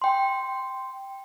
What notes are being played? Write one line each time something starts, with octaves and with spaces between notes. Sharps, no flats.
G5 C6